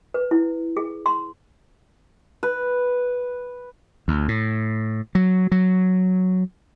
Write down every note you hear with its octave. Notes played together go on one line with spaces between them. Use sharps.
B4
E4
G#4
C6
B4
D2
A2
F#3
F#3